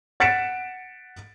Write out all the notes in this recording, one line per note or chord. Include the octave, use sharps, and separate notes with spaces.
F#5 A6 B6 C#7 D7 E7